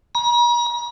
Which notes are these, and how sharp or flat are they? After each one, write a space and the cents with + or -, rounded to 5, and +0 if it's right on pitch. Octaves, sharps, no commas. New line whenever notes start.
A#5 +45